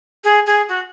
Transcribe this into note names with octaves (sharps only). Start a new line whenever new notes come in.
G#4
G#4
F#4